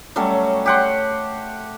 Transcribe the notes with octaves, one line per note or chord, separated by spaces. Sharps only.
F#3 G3 A3 C#4
G4 F#5 C6